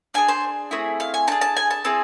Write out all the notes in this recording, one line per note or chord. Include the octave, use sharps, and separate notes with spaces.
D4 G#4 G#5
C5
A3 C4 E4 G#4
F5
G#5
D4 G#4 A5
A5
G#5
A5
C4 E4 G#4